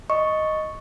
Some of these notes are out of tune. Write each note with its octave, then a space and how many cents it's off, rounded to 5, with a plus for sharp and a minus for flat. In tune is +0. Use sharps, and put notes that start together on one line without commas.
D#5 +0 C#6 +0